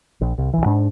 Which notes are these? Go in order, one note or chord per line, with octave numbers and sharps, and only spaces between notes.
A#1
C2
B1 E3
G#2 D4